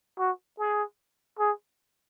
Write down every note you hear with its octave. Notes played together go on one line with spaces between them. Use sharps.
F#4
G#4
G#4